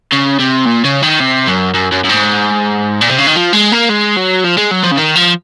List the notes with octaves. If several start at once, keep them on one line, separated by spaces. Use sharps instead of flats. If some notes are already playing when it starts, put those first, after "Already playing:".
C#3
C3
A#2
C#3
D#3
C3
F#2
F#2
F#2
F#2
G#2
A#2
C3
C#3
D#3
F3
G#3
A#3
G#3
F#3
F3
G#3
F#3
F3
C#3
D#3
F3